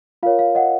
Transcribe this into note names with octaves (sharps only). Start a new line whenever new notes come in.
F4 A#4 C#5 F5
F5
D#5 F#5